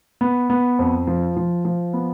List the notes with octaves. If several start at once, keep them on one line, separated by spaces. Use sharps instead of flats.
B3
B3
F2
F3
F3
F3
B3